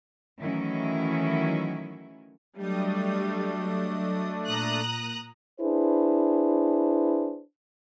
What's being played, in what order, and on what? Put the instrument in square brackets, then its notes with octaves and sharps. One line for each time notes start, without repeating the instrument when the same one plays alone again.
[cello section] D#3 E3 F#3 A3 C#4 E4
[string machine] F#3 D#5 D#6 [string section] G3 [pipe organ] A3 D4
[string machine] A#2 [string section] A#5 D#6 F#6
[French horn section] D4 E4 G#4 B4 C5